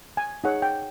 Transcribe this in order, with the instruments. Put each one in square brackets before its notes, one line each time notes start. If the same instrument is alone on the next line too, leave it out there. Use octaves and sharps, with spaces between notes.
[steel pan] G#5
D#4 G#4 C#5 F#5
G5